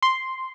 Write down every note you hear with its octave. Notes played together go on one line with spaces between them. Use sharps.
C6